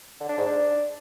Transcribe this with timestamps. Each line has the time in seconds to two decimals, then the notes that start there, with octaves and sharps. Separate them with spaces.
0.20 D3
0.29 D4
0.38 G#2
0.46 D4